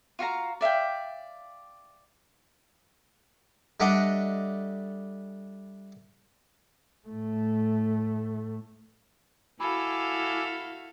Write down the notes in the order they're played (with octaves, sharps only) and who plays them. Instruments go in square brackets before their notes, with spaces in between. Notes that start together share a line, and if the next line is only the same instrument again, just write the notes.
[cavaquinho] F4 F#4 F5 A#5
D5 E5 F5 G5
[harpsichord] G3 A3 D4 D#5 F#5
[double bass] A2 A3
[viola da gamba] E4 F#4 [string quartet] A4 F5 [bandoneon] G#5 D6 E6 [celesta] B5